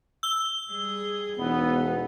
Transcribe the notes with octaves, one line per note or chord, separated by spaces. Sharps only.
E6 G7
G3 G#4
E1 B3 D#4